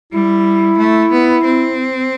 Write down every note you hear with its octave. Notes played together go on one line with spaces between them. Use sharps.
G3 E4
A3
B3
C4